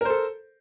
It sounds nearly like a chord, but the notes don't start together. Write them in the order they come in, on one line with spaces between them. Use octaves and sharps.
A#4 C5 A4